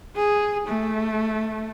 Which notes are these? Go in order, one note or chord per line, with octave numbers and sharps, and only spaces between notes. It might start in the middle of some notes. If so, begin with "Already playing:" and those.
G#4
A3